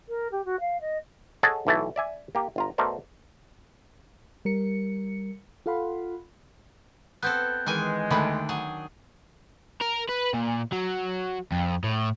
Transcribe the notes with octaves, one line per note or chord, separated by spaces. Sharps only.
A#4
G4
F#4
F5
D#5
G#4 A4 C#5 D#5 F#5 A5
B1 E3 A3 A5
D5 E5 G#5
A#3 G4
G1 F4 A#5
B2 A3 A#4 C5 D5
G3 A#4 C#7
F4 A4 F5 F#5 B5 C6
B3 C4 A4 F#6 G6
D#3 E3 G#3 G#5
D2 D#3 D4 B5
F#3 G#4
A#4
B4
A#2
F#3
F2
A2